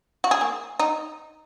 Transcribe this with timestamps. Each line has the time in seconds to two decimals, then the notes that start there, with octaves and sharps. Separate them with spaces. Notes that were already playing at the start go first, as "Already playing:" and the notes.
0.24 F#4
0.31 G#4
0.41 A#3
0.80 D#4